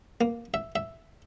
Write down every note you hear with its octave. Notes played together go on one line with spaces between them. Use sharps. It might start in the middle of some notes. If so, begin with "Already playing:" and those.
A#3
E5
E5